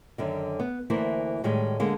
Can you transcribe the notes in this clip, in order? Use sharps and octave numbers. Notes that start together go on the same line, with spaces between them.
F#2 D3 D#3
B3
D2 E3 A#3 E4 C5
A2 D#3 G3 G#3
D3 G#3 A#3